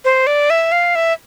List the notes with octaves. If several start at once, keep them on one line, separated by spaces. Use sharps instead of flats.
C5
D5
E5
F5
E5